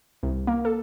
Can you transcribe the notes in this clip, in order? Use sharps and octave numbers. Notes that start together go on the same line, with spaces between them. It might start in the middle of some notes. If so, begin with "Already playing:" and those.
C2
A#3
A4